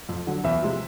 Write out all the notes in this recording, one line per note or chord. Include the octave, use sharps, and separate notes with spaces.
F2
D3 F#3
E2 E5
C3 F3 G#3